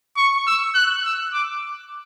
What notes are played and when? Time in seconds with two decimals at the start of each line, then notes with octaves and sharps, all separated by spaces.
0.17 C#6
0.47 E6
0.75 F#6
1.04 E6
1.33 D6